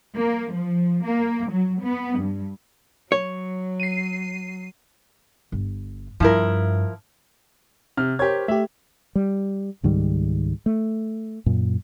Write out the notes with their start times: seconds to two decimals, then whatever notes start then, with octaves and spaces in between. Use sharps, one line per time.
0.17 A#3
0.52 F3
1.05 A#3
1.51 F#3
1.83 B3
2.19 G2
3.12 F#3 C#5
3.80 C7 D#7
5.52 G1
6.20 G2 F3 E4 A#4
7.97 C3 F6
8.19 G4 A#4 C5 C#5 G#6
8.48 A3 G4 E5
9.15 G3
9.83 C#2 G#2 D#3 G3
10.66 A3
11.46 F#2 A#2